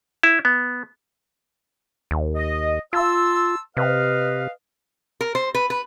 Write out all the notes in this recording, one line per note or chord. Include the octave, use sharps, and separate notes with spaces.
E4
B3
D#2
D#5
F4 A5 C6 E6
C3 B4 D#5 F5
A#4
C5
B4
B4